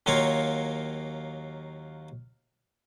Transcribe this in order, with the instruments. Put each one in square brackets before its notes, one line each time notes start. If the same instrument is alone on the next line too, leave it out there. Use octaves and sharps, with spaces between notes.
[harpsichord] D#2 F#3 A#3 F4 C#5